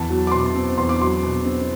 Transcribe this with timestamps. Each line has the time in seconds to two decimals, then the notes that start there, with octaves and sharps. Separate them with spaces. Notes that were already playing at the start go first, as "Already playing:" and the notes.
Already playing: E2 A5
0.10 F#3
0.27 D6
0.31 B2 C6
0.55 C4
0.78 E2 C6
0.89 D6
1.00 F#3 C6
1.23 B2
1.45 C4